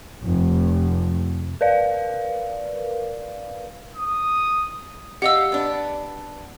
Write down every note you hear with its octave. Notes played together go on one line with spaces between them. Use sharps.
F1
A#4 B4 D5 F5
D#6
G4 D#5 F5 F#5 E6
B3 D4